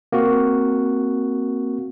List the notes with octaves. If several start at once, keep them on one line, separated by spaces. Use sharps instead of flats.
A#3 C4 F#4